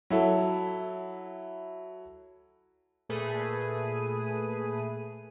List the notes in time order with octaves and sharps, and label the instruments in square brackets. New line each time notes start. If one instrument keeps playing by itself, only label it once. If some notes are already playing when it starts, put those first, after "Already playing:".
[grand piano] F#3 E4 A4
[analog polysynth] A#2 A3 G#4 A4 B4 D#7